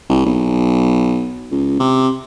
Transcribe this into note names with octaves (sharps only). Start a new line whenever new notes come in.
C2
B1
C#2
C3